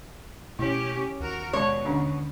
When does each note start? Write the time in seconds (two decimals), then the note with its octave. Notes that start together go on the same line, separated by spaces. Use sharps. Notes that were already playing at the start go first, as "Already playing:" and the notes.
0.59 B2 A3 C#4 E4 G4
1.20 D#2 F#4 A#4
1.53 B2 G#3 C#5 A5
1.85 D3 C#4 D4